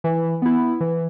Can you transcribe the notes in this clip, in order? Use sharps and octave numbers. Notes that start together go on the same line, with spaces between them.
E3
B3 E4
E3